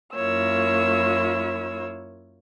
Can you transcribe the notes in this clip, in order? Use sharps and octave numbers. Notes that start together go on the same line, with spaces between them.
F#2 A#3 E4 F4 C#5 E6